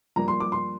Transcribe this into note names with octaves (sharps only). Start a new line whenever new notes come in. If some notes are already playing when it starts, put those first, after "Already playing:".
G2 F3 A#3 A#5
C6
D6
C6